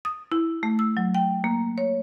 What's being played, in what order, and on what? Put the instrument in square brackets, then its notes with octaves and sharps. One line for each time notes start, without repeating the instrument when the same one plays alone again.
[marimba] D#6
E4
A3
E6
F#3
G5
A#3
C#5